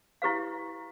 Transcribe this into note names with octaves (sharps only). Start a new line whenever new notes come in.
E4 G4 B4 F5